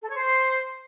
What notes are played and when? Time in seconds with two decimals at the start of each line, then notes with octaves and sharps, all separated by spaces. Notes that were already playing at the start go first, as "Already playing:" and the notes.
0.02 A4
0.09 C#5
0.16 C5